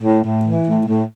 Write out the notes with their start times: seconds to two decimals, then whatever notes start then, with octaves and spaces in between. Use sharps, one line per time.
0.02 A2
0.23 A2
0.45 E3
0.65 A2
0.86 A2